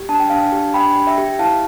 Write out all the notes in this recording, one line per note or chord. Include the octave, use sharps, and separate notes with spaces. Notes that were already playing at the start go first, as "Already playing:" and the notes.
Already playing: G4
D4 A5
G5
D4 F5 A5
G4
D4 G5 B5
G4
E5 G5
G4
E4 F5 A5